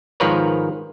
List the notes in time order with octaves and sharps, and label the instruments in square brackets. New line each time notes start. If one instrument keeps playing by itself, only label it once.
[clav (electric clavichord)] G#2 D#3 F3 A#4 B4 C#5